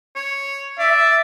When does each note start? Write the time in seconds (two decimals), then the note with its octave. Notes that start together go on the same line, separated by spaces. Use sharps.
0.16 C#5
0.79 D5 E5